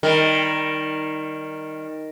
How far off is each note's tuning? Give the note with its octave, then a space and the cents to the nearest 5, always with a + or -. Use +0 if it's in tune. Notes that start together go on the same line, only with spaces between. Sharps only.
D#3 +0 G3 +10 A#4 +0